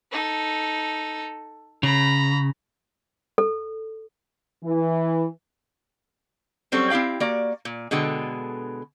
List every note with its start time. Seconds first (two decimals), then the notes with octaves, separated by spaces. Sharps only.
0.12 D#4 A4
1.83 C#3 A#5 B5
3.38 A4
4.64 E3
6.72 F#3 G3 C4 C#4 A4
6.90 C4 E4 G4 F5 G5
7.20 A#3 F#4 D5
7.65 A#2
7.91 B2 D3 G#3 A4 G5